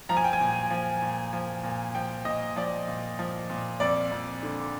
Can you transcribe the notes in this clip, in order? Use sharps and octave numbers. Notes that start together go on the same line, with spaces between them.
F3 A#5
G#5
G5
G#5
A#2
F3
A#2
F3
A#2
F3 G5
A#2 D#5
F3 D5
A#2
F3
A#2
F2 D5
F2
D3